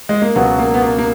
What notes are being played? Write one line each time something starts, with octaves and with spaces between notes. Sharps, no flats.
G#3
A#3
C#2 B2 F#3 B3
A#3
B3
A#3
A#3